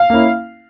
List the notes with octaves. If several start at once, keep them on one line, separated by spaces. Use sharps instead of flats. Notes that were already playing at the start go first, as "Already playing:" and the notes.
Already playing: F5
A#3 C#4 E4